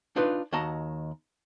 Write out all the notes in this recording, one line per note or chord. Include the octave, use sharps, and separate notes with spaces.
D4 D#4 F4 B4
D#2 F#4 D#5 A5 A#5